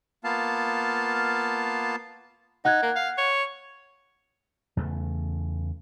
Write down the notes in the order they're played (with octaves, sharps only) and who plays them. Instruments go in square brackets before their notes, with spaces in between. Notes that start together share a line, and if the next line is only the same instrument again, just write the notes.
[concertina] A#3 B3 F4 F5 A5
[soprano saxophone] D#4 [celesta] F#5 F#6 G#6
[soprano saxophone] A#3
F5
C#5
[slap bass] E2 C#3 A3